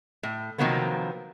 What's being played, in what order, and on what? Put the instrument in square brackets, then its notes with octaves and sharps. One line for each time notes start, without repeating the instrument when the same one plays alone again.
[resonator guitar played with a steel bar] A2
C3 D#3 F3 F#3 A#3 B3